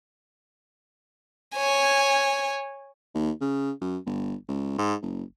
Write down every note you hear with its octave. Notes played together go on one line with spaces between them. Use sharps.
C#5 G#5
D#2
C#3
F#2
G1
C#2
G#2
F#1